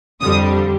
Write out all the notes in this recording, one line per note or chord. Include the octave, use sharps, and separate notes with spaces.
F2 D3 G3 D#6